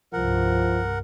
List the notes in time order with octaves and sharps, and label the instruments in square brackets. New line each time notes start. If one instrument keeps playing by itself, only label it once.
[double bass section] C2 G2 [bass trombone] F3 [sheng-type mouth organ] A#4 F#5